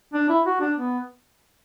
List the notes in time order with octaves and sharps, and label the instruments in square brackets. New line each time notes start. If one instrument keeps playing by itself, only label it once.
[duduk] D4
E4
F#4
D4
B3